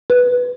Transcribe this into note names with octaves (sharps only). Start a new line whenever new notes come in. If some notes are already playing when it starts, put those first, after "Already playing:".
B4